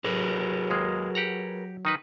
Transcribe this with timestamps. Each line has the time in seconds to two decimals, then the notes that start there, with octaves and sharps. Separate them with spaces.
0.04 F#3 G#4 A#4 B4
0.70 D#2 G#3 A#3
1.15 G4 F#5 A#5
1.85 D#3 D#4 B4